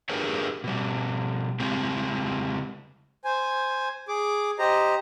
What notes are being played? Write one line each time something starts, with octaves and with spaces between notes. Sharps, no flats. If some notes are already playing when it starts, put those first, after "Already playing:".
D4 G4 G#4 A#4 B4 C#5
B2 G3
C#3 G#3 C4 G4
C5 G#5
G#4 D6
G4 C5 D#5 A#5